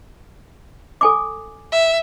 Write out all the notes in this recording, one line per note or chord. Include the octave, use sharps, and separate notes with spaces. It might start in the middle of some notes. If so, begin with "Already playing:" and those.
A4 G#5 D6
E5